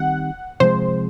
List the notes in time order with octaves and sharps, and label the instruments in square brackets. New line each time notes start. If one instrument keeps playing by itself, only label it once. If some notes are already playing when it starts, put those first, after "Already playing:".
Already playing: [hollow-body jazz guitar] D#3 G3 C4 D#4 [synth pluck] F#5
[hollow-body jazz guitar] C3 F3 G#3 [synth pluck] C5